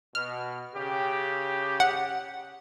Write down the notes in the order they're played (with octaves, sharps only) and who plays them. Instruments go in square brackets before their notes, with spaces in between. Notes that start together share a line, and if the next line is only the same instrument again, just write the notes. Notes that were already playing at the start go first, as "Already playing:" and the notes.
[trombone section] B2 [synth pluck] F6
[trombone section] C#3 G4
[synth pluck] F#5